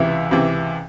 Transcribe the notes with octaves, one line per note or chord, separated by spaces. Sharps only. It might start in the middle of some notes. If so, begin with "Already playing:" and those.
Already playing: C#2 C3 E3 E5
C#2 C3 E3